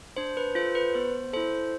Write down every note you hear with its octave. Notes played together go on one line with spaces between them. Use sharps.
D4 C5
B4
F4 A4 C5
B4
B3 C5
E4 A4 C5